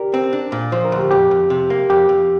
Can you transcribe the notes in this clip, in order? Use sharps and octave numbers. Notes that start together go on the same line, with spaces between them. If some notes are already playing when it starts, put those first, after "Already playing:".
Already playing: G4 A#4 D5
C4
D4
A#2
F3 C5
A#4
D2
G4
F2 G4
F2
C3
A#3
F2 G4
F2